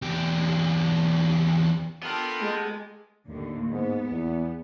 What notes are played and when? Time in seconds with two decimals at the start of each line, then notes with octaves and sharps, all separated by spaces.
0.02 E2 G4
2.03 B3 D4 F4 G4 A4 A#4
2.40 G#3
3.28 D#2 A2 D3
3.72 G#2 B3
4.11 E2